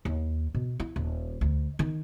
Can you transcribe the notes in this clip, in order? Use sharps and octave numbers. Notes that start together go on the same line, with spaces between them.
D#2
B2
E4
D#1
D2
D#3